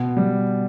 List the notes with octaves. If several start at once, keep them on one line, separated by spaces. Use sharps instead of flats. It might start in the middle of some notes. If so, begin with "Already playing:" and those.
Already playing: B2
G3